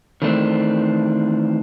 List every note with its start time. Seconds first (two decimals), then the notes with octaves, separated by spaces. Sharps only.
0.22 D#3 E3 A3 C4 D4